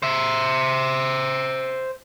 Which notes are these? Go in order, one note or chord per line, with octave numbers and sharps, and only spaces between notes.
C5 E5